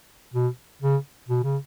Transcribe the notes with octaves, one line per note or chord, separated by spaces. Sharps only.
B2
C#3
B2
C#3